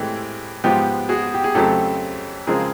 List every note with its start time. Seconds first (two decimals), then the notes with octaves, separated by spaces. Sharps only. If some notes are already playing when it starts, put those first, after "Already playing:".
Already playing: A2 E3 G#3 C4 G4 A4
0.64 G#2 F3 G#3 B3 G4
1.09 F#4 G#4
1.34 G4
1.44 G#4
1.55 F2 C#3 F#3 A3 C4 G4 A4
2.47 C#3 F3 G#3 C4 G#4 A#4